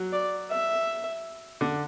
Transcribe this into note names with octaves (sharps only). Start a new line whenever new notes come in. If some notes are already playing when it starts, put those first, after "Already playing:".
Already playing: F#3
D5
E5
D3